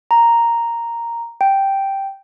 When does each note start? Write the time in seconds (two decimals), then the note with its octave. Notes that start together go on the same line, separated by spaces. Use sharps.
0.11 A#5
1.41 G5